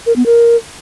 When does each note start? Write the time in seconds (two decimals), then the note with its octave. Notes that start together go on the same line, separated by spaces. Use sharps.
0.06 A#4
0.16 B3
0.26 A#4